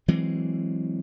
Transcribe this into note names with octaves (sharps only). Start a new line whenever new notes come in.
E3 F#3 G#3 C4